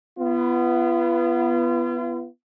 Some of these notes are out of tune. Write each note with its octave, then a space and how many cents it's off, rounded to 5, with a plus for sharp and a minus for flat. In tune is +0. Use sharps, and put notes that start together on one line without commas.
B3 +0 F4 -45